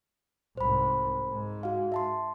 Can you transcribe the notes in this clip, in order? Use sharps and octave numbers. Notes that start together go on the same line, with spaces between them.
C2 G#2 C5 B5
G#2 G#3
F#4 F5
E5 A5 C6